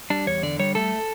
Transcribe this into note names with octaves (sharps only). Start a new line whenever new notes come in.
G3 D4
E2 C#5
D3 D5
G3 C#5
A3 A4